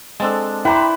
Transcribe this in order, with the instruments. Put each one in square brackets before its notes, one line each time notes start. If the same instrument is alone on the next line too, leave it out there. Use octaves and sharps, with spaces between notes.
[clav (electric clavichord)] G#3 C4 A4 [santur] D4 A5
[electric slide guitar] E4 [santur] B4 C5 C6 [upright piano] G5 A#5 D6